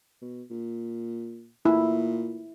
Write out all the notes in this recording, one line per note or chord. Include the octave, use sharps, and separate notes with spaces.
B2
A#2
A#2 E4